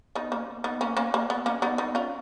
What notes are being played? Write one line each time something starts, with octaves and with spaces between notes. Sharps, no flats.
B3 D#4
A#3 C#4
B3 D#4
A#3 C#4
A#3 C#4
A#3
B3
A#3 C#4
B3 D#4
B3 D#4
C#4 F4